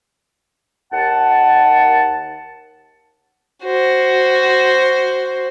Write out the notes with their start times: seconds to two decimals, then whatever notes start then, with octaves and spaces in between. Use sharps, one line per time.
0.93 D#2 F#5 A5
3.64 F#4 C5